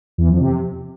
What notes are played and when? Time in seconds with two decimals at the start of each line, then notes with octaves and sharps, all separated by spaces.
0.18 E2
0.29 F2
0.40 C3